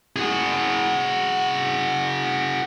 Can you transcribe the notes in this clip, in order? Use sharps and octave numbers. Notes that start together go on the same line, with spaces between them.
F#4 G#4